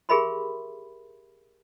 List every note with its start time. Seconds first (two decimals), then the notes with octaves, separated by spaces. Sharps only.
0.09 G4 G#4 A#4 E5 B5 C6